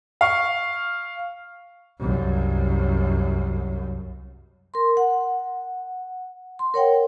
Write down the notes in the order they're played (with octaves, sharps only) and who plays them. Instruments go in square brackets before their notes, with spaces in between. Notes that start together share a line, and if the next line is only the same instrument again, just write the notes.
[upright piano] F5 C#6
[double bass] C2 F#2
[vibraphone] A#4 C6
F#5
C6
A#4 C#5 F#5 G5